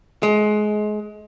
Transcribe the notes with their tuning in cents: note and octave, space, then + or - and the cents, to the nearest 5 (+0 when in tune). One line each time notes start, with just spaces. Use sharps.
G#3 +25